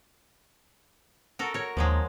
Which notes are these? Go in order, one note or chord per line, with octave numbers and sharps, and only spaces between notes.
F#4 A4 A#4
A#4 C#5
D#2 F3 F#3 G#3